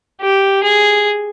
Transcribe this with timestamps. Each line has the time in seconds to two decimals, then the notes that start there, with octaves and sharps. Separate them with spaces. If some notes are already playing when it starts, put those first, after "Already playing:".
0.21 G4
0.64 G#4